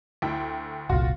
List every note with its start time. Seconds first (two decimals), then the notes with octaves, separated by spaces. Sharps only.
0.22 D2 E4 G5
0.89 F1 C2 A#2 F4 F#4